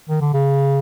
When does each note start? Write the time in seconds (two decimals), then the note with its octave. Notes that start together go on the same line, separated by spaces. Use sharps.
0.09 D#3
0.21 D3
0.34 C#3